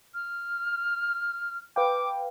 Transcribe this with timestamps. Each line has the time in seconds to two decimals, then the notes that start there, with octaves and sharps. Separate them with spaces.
0.14 F6
1.76 B4 F5 G5 D6